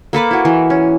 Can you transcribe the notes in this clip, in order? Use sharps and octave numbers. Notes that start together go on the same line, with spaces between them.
A#3 A4 B4 D6
E4 F#4
E3
C#4